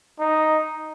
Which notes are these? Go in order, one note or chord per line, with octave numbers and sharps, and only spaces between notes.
D#4